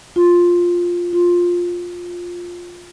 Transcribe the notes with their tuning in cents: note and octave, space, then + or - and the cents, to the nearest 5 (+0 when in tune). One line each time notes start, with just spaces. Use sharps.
F4 +5
F4 +10